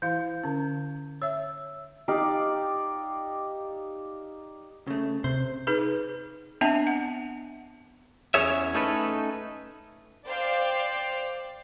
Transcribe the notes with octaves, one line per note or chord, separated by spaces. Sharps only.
E3 E4 F5 G6
D3 C#4
C#5 E5 E6
D#4 G4 D5 F5
C#3 A3
C3 C5
D#4 G#4 B4
B3 C4 D4 D#5 E5 A5
F#5
E2 C#4 G#4 C#5 E5
A3 C#4 D#4 A4 B4
C5 D5 F5 G5